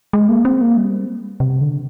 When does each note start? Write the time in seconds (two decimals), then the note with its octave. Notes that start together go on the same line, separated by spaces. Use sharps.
0.13 G#3
0.29 A#3
0.45 C4
0.61 A#3
0.77 G3
1.40 C3
1.61 D3